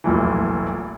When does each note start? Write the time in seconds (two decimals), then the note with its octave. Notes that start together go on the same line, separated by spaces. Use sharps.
0.04 F1 B1 A#2 E3